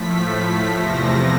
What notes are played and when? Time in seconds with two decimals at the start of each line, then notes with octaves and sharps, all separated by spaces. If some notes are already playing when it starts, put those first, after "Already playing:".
Already playing: A2 F3 A3 B6
0.25 B6
0.72 E2 C3 F3 A3 A#6